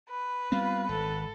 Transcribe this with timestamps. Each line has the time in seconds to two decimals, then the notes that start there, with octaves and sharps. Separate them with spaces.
0.10 B4
0.52 G3 B3 C4 F4
0.89 G#1 A4